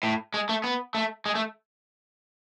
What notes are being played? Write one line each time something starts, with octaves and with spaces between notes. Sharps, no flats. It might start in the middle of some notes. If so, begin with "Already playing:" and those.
A2
G#3
A3
B3
A3
G#3
A3